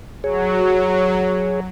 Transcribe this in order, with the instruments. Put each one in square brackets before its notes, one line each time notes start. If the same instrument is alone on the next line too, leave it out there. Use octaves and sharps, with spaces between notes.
[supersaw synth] F#3 [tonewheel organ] G#4 C#5